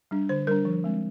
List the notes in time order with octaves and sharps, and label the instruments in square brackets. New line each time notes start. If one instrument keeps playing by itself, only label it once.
[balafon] G3 D4
D3 C5
G3 D4 A#4
F3
G#3 C4